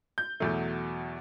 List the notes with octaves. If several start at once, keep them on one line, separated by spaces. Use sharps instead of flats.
G6
E2 B2 F#3 A3